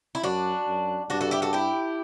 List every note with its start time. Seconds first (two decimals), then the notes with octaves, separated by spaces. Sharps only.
0.15 E4
0.23 F#2 D4 F#4
0.67 F#2
1.10 G2 D4 F#4
1.21 F#4 A4
1.31 E4 G4
1.42 F#4 A4
1.53 E4 G4